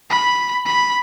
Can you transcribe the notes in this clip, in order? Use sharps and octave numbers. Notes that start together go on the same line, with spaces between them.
B5
B5